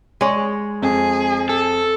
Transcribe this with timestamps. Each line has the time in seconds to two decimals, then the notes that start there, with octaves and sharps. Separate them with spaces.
0.21 G#3 C#5
0.82 F2 G#4
1.49 A4